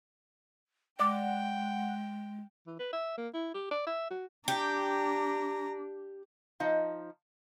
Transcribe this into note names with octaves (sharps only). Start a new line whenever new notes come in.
G#3 D5 F#5 G5
E3
B4
E5
A#3
E4
G4
D5
E5
F#4
D4 G4 A#5
F3 D#4 D#5 F5 A5